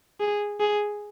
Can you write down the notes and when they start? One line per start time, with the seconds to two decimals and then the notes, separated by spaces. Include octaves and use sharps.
0.20 G#4
0.60 G#4